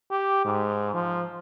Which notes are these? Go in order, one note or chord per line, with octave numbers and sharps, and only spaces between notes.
G4
G#2
F3